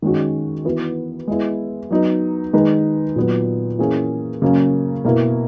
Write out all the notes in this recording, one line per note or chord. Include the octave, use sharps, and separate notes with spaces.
D#3 G#3 C#4 F#4
E3 B3 F#4 B4
G#3 B3 E4
F#3 B3 D#4
D#3 G#3 D#4 G#4 B4
A#2 F#3 B3
E3 A#3 C#4 G#4
C#3 F#3 A#3 C#4
B2 A#3 E4 A#4